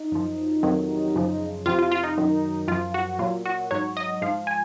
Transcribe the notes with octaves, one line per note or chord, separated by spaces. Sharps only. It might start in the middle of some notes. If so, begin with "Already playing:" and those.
Already playing: D#4
F#2 F3
F2 C3 D#3 F#3
F#2 C#3 F3
F2 C3 F3 F4
F4
F4
D#4
F#2 D#3 F#3
F#2 F3 F4
F#4
A#2 F#3 F4
F#4
G#2 F#3 C#5
D#5
G#2 F3 F5
G#5